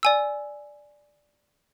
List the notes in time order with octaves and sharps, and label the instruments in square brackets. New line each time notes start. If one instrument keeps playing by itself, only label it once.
[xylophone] D5 G#5 E6